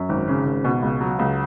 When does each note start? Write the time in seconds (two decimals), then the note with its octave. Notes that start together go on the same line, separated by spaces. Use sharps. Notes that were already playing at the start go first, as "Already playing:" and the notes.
Already playing: F#2
0.09 G#1
0.28 C#3
0.45 G#1
0.64 B2
0.82 C#2
1.01 F#3
1.19 C#2